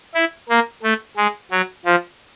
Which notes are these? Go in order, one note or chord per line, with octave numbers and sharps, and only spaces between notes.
E4
A#3
A3
G#3
F#3
F3